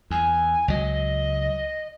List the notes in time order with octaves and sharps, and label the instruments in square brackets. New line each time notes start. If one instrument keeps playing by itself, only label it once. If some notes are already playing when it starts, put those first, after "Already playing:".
[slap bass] E2 [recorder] G#5
[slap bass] C#2 F#3 [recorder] D#5